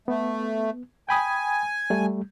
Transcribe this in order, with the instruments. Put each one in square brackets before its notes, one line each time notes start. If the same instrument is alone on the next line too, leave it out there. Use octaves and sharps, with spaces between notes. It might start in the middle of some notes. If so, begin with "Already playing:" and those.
[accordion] A3 [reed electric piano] B3
[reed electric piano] G5 B5 D#6 [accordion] G#5
[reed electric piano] G3 A3